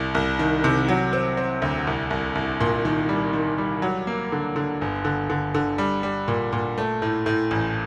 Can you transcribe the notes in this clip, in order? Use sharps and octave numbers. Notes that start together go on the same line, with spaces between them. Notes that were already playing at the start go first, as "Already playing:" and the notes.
Already playing: C2
C2
D#3
C3
F#3
C4
C4
D2
C2
C2
C2
A#2
D#3
G3
D#3
G3
F#3
A#3
D3
D3
G1
D3
D3
D3
G3
G3
A#2
A#2
A3
A2
A2
A1